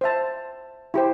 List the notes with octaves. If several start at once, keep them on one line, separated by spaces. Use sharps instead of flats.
C5 E5 A5
E4 G4 C5